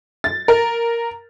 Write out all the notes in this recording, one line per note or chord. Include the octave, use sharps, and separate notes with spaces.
A6
A#4